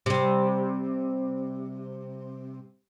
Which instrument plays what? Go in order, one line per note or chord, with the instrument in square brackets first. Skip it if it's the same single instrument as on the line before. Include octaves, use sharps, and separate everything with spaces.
[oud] C3 G3